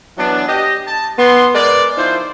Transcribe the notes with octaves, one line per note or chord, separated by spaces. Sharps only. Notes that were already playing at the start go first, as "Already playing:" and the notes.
E3 F#3 B3 D4
G4 D#5
A5
B3 C6
G#3 A#4 B4 D5
F3 D#4 E4 C5